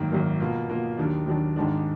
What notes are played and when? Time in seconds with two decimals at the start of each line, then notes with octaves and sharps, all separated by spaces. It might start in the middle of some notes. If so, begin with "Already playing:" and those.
Already playing: G#1 F#2 D#3 A#3
0.11 G#1 F#2 D#3 A#3
0.40 B2 A#3 F4
0.69 B2 A#3 F4
0.97 D#2 D#3 F#3 D4
1.26 D#2 D#3 F#3 D4
1.56 G#1 G#2 D#3 G#3 D4